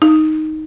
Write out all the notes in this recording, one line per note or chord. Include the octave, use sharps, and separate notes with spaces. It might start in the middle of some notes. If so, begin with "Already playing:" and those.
D#4